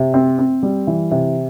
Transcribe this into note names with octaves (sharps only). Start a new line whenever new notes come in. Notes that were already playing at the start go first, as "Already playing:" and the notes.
Already playing: C3
C4
C4
G3
E3
C3